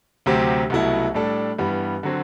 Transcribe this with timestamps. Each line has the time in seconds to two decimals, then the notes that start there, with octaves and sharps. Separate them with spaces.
0.26 D2 C3 F#3 C4 G4
0.70 C2 B2 F#3 A3 E4
1.14 A2 G3 D4 A4
1.58 G2 E3 G3 B3
2.03 D3 F#3 C4 F#4